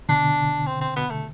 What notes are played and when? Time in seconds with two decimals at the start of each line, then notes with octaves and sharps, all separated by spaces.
0.09 B2 D3 D4
0.67 C4
0.81 C4
0.96 B3
1.10 A3